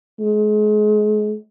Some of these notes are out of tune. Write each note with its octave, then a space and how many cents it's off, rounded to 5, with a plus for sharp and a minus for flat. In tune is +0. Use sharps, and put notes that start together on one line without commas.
G#3 +35